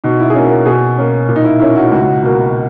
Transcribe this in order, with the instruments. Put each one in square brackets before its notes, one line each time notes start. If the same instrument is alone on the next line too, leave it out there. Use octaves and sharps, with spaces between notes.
[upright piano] B2 D#4
E4
G#4
A#3 C#4 F#4
A#4
B2 G#4
A#3 C#4
A#2
D#4
E4
A#3 C#4 E4
F#4
E4
C#2 F#4
B2 A#3